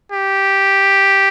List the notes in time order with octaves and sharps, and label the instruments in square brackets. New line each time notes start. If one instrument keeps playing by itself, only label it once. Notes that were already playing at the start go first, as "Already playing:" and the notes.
[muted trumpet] G4